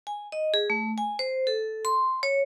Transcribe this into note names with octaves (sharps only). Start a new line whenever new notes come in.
G#5
D#5
G#4
A3
G#5
C5
A4
C6
C#5